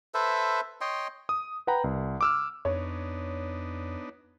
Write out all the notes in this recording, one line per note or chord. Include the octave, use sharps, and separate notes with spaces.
A4 B4 C5 E5
C#5 D#5 G5 C6
D#6
B4 F#5 G5 A#5 B5
C2
D6 E6 F6
F2 B3 D4 D#4 C#5